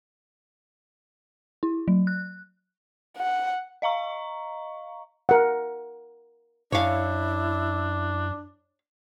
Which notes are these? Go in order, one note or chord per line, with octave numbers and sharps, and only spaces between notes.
E4
F#3
F#6
F#5
D#5 F5 A#5 C#6
A#4 F#5
F#2 D4 E4 C#5 F5